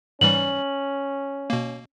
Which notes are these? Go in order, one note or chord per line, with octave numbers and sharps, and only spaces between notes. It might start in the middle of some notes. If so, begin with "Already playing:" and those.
G#2 E3 G3 C#4 F#7
B2 A#3